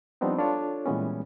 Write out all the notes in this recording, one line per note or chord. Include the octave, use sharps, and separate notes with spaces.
F3 G3 B3 C4 D4 D#4
D4 F4 A4 C#5
A#2 E3 G3 G#3 B3 C#4